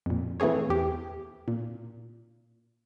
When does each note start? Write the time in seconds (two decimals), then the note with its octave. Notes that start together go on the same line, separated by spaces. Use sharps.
0.06 F2 A#2
0.40 E3 A3 C4 G#4 C#5
0.69 E2 G4
1.48 A#2